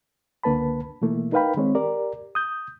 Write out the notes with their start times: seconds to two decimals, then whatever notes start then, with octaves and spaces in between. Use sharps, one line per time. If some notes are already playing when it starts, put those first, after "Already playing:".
0.43 C#2 D3 A#3 B4 A5 B5
1.02 B2 E3 A3 A#3 E4
1.32 D#4 A#4 B4 F5 G5 B5
1.57 D#3 G#3 C4 C#5
1.75 G4 A#4 D5
2.35 D#6 G6